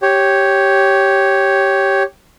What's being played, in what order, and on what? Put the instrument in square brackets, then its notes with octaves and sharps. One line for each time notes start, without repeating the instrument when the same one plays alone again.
[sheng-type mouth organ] G4 C#5